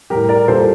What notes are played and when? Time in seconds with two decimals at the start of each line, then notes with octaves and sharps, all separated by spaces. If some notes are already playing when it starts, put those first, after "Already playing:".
0.10 A2 G3 G4 A#4
0.29 A#4 D5
0.48 A#2 G3 A4 C5